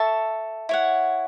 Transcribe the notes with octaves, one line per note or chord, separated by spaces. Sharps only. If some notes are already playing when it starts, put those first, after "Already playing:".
Already playing: A4 E5 A5 C#6
E4 C#5 F#5